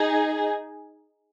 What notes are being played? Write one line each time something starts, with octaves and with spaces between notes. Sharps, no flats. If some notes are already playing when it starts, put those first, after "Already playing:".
Already playing: D#4 G#4